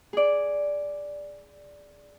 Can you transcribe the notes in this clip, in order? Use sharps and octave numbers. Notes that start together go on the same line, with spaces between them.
G#4 D5